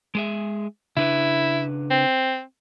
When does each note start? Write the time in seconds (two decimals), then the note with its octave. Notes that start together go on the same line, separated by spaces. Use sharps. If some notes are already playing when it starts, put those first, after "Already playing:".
0.15 G#3 G#4 E5
0.97 C#3 D4 E4 B4
1.91 C4